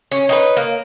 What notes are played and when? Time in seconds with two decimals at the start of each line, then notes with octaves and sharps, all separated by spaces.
0.12 C#4 C#5
0.29 D#4 G4 B4
0.57 A#3